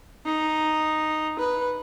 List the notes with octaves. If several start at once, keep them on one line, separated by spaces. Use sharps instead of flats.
D#4
B4